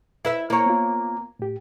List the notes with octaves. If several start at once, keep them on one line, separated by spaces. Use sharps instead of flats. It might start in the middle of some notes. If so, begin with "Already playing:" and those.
E4 B4 E5
A#3 E4 C#5
B3 F4
A2 G4